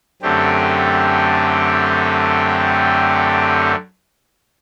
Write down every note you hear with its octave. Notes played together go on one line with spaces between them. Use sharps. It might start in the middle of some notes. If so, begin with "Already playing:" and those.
F#2 D3 A3 C4 G4